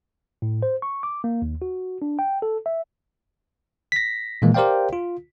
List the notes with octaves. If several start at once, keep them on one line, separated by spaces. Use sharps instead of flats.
A2
C5
C#6
D6
A#3
D#2
F#4
D4
G5
A4
E5
A#6 B6
A#2 D#3 E3 G#3 A#3
G4 A#4 C5 D5 F5 G5
F4